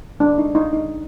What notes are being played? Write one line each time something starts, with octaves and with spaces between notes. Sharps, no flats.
D4
D#4
D#4
D#4